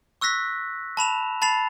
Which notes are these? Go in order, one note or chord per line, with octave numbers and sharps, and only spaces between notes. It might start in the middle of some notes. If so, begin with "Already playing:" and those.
C#6 E6 F#6 A#6 B6
A5 B5 E7 F7
A5 B5 A6 C7 F7